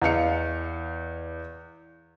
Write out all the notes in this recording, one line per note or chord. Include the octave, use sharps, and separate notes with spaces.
E2 D#5 F5 C#7